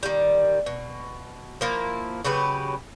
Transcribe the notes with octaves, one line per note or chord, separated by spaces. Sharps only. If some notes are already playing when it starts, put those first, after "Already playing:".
D#3 G3
B2
F3 A#3 E4
C#3 F#3 G4 B4